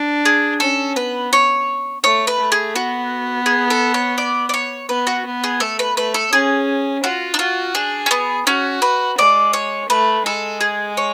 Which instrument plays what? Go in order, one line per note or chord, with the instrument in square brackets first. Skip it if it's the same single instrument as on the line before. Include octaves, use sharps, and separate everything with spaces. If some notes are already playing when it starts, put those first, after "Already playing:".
Already playing: [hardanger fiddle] D4
[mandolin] G#4
[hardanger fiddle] C#4 [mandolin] A4
[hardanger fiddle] B3 [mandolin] B4
[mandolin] C#5
[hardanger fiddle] A3 [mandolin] C#5
[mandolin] B4
[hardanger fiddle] A3
[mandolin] G#4
[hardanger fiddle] B3 [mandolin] F#4
[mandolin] G#4
A4
C#5
D5
D5
C#5
[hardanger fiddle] B3 [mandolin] B4
[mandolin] F#4
[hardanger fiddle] B3
[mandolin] G#4
[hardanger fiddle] A3 [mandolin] A4
[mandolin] B4
[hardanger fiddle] A3 [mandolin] B4
[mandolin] A4
[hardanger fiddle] C#4 [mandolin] G#4
[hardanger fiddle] F4 [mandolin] F#4
[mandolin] D4
[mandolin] F4 [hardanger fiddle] F#4
[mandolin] D4 [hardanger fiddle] G#4
[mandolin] C#4
B3
[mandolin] C#4 [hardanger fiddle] F#4
[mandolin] B4
[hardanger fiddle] G#3 [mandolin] D5
[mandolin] C#5
[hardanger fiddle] A3 [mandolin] B4
[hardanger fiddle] G#3 [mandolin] A4
[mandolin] G#4
C#5